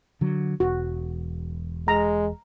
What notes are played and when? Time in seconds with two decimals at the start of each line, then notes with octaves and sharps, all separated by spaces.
0.21 D3 F#3
0.60 E1 F#4
1.88 G#3 A#5